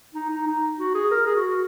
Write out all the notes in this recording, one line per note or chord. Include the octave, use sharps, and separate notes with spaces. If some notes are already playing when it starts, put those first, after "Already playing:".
D#4
D#4
D#4
F#4
G#4
A#4
G#4
F#4